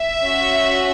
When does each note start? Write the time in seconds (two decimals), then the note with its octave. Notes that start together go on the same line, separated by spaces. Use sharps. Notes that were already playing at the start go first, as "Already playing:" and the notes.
Already playing: E5
0.24 C#4 F#4